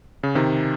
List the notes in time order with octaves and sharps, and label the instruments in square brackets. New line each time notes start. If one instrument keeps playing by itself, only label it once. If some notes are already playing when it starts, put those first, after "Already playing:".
[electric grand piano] C#3
C3 D#3